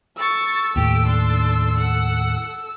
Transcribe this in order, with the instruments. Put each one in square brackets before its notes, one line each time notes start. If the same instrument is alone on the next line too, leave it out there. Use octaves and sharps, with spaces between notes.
[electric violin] A4 E6 [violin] C#6 A6
[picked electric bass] D#2 A2 [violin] G4 D7
[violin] D4 C6
F#5